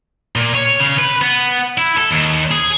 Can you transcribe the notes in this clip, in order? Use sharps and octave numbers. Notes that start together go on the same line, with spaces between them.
A#2
C#5
C#3
B4
B3
E4
A4
D#2
G#4